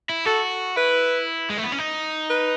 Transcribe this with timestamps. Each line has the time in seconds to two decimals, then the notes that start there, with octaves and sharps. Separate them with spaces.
0.09 E4
0.25 F#4 A4
0.76 E4 B4
1.50 G#3
1.57 A3
1.64 B3
1.72 C#4
1.79 D#4
2.30 B4